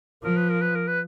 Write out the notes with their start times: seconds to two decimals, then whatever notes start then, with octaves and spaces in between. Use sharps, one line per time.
0.24 F3 A#4
0.37 B4
0.50 A#4
0.61 B4
0.75 A#4
0.87 B4